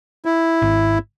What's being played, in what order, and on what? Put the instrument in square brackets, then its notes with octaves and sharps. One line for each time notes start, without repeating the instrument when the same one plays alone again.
[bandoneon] E4
[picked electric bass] G#1